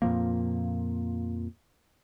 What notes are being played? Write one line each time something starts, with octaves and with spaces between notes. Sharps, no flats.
F2 A#2 F3 A#3